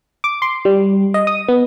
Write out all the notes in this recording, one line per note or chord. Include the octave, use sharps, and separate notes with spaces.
D6
C6
G3
D#5
D#6
B3